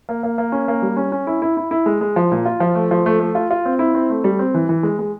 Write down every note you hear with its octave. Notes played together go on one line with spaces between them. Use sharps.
A#3
A#3
A#3
C#4
A#3
G3
C#4
C#4
E4
E4
E4
E4
G#3
G#3
F3
A#2
F4
F3
A3
F3
A3
A3
F4
F4
C4
E4
C4
A3
G3
C4
E3
E3
G#3
G#3